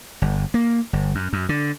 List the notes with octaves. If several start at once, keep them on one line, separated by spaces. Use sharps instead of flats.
G1
A#3
G1
F#2
F#2
D3